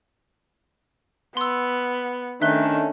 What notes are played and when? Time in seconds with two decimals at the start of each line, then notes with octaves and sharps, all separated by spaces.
1.37 B3 C6 E6
2.42 D#3 A3 C#4 D4 E5 F#6 G7